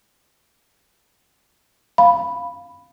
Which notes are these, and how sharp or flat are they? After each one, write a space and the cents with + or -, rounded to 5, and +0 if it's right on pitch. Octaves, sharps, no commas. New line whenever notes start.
F5 +0 B5 +0